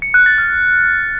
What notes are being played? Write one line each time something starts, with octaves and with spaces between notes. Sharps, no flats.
C#7
F#6
A6
F6